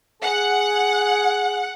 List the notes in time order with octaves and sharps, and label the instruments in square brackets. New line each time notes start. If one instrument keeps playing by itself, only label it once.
[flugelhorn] G#4 [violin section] F#5